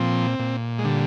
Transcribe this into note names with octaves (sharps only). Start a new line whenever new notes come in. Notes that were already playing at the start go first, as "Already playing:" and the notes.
Already playing: A#2 F3 C4
A#2
G#3
D3 G3